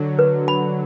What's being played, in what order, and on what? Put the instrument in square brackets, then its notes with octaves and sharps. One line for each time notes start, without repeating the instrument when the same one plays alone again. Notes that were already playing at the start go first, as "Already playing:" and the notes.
Already playing: [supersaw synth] D3 F#3
[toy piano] B4
B5